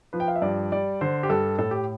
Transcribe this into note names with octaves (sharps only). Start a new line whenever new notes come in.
F3 B4
G5
F5
E5
G2 D5
G3 D5
D3 C5
G4
G2 A4
A2 A4
G4